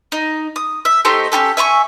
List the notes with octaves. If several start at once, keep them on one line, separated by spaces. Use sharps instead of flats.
D#4
D#6
E5
A3 D#4 G4 C5
C#4 F4 G4 A4
E5 G#5 A#5 C#6